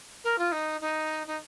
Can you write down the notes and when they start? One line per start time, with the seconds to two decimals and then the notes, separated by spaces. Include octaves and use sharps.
0.24 A#4
0.38 F4
0.52 D#4
0.81 D#4
1.27 D#4